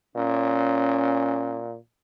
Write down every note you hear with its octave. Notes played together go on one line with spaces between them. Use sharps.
A#2 C#4